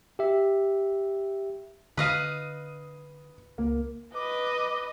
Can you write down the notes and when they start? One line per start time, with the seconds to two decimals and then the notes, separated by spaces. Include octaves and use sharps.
0.19 G4 E5
1.97 D3 B4 D#5 F5 D#6 D#7
3.58 C#2 A#3
4.15 B4 D#5 D6